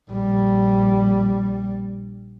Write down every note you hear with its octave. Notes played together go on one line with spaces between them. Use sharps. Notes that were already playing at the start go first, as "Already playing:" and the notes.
A#1 G3